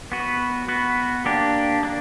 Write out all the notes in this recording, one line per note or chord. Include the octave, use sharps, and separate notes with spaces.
B3 F#4 B4
B3 F#4 B4
A#3 D4 G4
A#3 D4